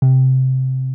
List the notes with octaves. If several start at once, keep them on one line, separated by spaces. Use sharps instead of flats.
C3